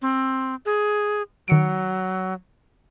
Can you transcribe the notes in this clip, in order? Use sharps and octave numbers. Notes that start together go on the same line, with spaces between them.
C4
G#4
D#3 F#3 C#7 D7